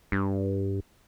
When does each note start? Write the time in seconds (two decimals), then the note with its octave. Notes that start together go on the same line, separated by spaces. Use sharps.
0.12 G2